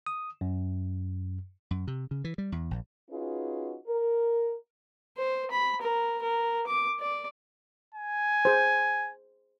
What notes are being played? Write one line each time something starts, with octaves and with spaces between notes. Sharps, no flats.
D#6
F#2
F#2
C3
C#3
E3
G3
E2
A#1
C#4 D#4 F4 F#4 G#4 B4
A#4
C5
B5
A#4
A#4
D6
D5
G#5
G#4 C5